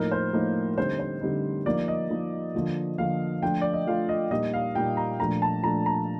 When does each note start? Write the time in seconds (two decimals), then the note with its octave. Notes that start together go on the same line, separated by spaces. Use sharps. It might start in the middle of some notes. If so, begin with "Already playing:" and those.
Already playing: A2 F3 A#3 D#4 A#4
0.11 C5
0.33 A2 F3 A#3 D#4
0.78 D3 G3 C4 D#4 C5
0.99 C5
1.21 D3 G3 C4 D#4
1.66 F3 A#3 D#4 D5
1.88 D#5
2.10 F3 A#3 D#4
2.54 D3 F3 A#3
2.98 D3 F3 A#3 F5
3.43 F3 A3 D4 F4 G5
3.61 D5
3.73 D#5
3.87 F3 A3 D4 F4 F5
4.09 D#5
4.31 A#2 G3 A#3 D#4 D#5
4.53 F5
4.75 A#2 G3 A#3 D#4 G5
4.97 A#5
5.20 A#2 F3 A3 D4 A#5
5.42 A5
5.63 A#2 F3 A3 D4 A#5
5.86 A#5